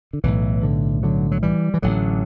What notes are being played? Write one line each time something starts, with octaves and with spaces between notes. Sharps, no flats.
D3
B1 A2 E3
D3
D3 F#3
F#3
E3 G3
E3
A1 A2 D3 F#3